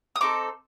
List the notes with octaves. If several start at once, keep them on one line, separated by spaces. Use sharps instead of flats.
D#6
C4 D#4 A4 D6